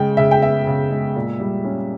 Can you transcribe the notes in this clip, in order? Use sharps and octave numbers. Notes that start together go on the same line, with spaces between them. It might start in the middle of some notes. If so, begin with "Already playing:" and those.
Already playing: C#3 G#3 G5
C#3 E5
G5
B3 E5
C#3
G#3
A#2
G3
C#4